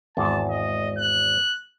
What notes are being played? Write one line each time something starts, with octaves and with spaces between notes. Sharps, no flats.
G#1 E2 A5
D#5
F#6